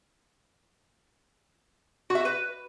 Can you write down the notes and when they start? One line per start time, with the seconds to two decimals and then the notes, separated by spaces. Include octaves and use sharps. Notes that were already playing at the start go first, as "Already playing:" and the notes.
2.10 F#4
2.15 E5
2.20 F#4
2.25 B4